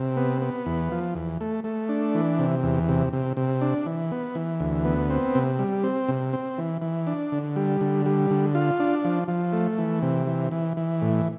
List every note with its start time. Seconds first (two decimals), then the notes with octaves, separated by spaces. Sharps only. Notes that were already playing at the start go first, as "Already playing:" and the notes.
Already playing: C3
0.17 B3
0.42 B3
0.66 E2
0.92 F3
1.15 E2
1.41 A3
1.64 A3
1.89 D4
2.15 E3
2.39 C3
2.63 E2
2.89 C3
3.13 C3
3.37 C3
3.61 D4
3.86 E3
4.12 B3
4.35 E3
4.60 D2
4.85 B3
5.10 C4
5.35 C3
5.59 G3
5.84 C4
6.08 C3
6.33 C4
6.58 E3
6.82 E3
7.07 D4
7.32 D3
7.56 G3
7.81 D3
8.06 G3
8.31 D3
8.55 F4
8.80 D4
9.05 F3
9.28 F3
9.53 A3
9.78 E3
10.02 C3
10.27 E3
10.52 E3
10.77 E3
11.02 A2